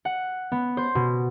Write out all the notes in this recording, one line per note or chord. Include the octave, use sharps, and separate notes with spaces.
F#5
B3
C5
B2